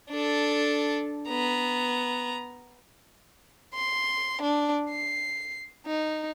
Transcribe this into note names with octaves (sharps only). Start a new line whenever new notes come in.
D4 A4
B3 A#5
C6
D4
C7
D#4